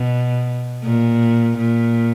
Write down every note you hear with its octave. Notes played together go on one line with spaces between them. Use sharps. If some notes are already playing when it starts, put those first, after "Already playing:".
Already playing: B2
A#2
A#2